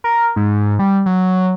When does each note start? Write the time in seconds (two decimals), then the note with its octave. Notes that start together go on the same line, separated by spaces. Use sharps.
0.04 A#4
0.36 G#2
0.79 G3
1.06 F#3